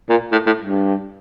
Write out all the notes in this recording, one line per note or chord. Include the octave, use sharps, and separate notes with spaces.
A#2
A2
A2
G2